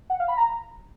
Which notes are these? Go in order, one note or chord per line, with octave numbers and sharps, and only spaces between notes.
F#5
F5
B5
A#5